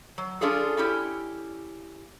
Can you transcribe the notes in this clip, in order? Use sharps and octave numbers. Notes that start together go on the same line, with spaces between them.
F#3
C#4 D4 F4 G#4 A4
C#4 E4 G4